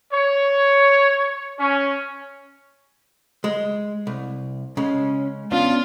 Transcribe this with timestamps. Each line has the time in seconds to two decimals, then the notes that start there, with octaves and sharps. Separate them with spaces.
0.13 C#5
1.60 C#4
3.44 G#3
4.07 C2
4.77 C#3 G#3 C#4
5.52 B3 C#4 D4 F4